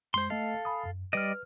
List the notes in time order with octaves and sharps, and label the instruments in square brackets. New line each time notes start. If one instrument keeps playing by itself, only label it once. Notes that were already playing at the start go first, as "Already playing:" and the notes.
[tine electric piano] F#2 G#3 [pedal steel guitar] C5 C6
[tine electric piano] A3 D#5 [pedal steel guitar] A4 F5
[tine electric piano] G#5 B5 D#6
F#2
[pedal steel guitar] G3 D5 D#5 [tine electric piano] B4 F6